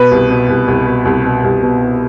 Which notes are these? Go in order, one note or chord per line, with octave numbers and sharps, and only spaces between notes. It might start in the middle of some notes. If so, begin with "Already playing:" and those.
Already playing: B2 B4
C2
B2
C2
C2
B2
C2
B2
C2
B2
B2